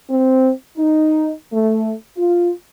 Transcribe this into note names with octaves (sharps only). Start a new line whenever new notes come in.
C4
D#4
A3
F4